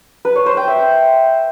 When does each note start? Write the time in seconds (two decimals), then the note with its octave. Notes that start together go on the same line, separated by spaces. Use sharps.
0.25 B4
0.36 C#5
0.46 C5
0.57 G5
0.68 E5